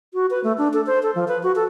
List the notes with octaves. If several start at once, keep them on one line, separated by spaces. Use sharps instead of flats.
F#4
B4
A3
D4
A4
C5
A4
F3
B4
F#4
A4